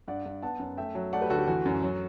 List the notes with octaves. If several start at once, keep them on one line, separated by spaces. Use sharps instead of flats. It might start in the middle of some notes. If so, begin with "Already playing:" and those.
G2 D5 F#5
G2
B3 F#5 A5
F#2
A3 E5 G5
F#3
A3 D5 F#5
G4 B4
D2 F#4 A4
G4
E3 F#4
F#2
F#3